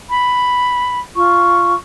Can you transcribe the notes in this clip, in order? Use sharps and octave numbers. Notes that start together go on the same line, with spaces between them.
B5
F4 C#6